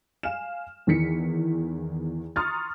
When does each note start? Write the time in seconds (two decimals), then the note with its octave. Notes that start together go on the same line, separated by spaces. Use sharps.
0.23 F5 G#5 F6 E7
0.87 E2 D#3 E3 B6 C#7
2.36 A#5 C6 C#6 D#6 F6 A6